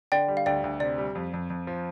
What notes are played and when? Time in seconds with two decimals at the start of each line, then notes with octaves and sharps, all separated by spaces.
0.12 D3 D5 G5
0.28 G3
0.37 F5
0.46 D2 D5 G5
0.64 D2
0.80 C3 D5
0.98 G3
1.15 F2
1.34 F2
1.50 F2
1.67 F3